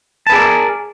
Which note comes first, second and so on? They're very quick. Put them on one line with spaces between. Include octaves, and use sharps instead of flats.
A5 B4 G#4 D5 A#4